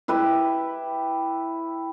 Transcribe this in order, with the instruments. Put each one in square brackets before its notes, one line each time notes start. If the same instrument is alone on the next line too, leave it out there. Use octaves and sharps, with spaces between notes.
[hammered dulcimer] E4 G4 B4 E5